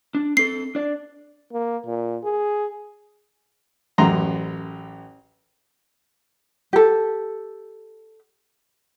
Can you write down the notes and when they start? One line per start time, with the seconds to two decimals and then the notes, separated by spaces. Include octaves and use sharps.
0.15 D4
0.37 C4 A4 C7
0.75 D4 D5
1.53 A#3
1.86 A#2
2.24 G#4
3.98 A1 F#2 A#5 C6
6.73 G4 A4